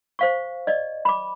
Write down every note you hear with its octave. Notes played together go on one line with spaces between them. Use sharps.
C5 F5 C#6
D5 D#5
B5 D6